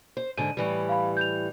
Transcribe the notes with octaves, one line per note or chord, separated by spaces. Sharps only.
C5
G#2 D3 D#7
A2 E3 G3
F5 B5
G6 F7